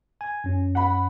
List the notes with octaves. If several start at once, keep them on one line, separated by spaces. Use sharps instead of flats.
G#5
F#2 C#4
F#5 B5